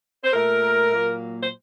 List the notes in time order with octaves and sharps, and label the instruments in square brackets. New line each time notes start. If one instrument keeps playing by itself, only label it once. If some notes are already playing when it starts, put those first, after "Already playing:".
[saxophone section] C5
A#2 A3 A#4
A#2 F#3 A#3
C5